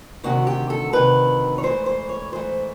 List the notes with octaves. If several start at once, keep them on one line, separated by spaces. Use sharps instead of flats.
D2 C3 D#3 F#4
G4
A4
D2 C3 D#3 B4
C#5
G#2 E3 A3 C5
C5
C#5
G#2 E3 A3 C5